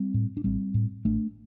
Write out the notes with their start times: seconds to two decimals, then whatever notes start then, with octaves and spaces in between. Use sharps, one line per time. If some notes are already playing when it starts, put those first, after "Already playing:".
Already playing: G3 C4
0.14 A2
0.37 D4
0.44 A1 G3 C4
0.74 A2
1.05 A1 A3 D4